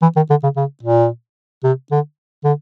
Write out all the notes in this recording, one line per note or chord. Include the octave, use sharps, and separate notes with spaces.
E3
D#3
D3
C#3
C#3
A#2
C3
D3
D3